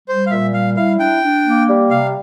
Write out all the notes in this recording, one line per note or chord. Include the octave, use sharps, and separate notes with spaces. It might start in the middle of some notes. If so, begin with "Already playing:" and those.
G3 C5
F5
A#2 E5
G3 F5
E4 F5
D4 G5
D4
A#3
G3
C3 F5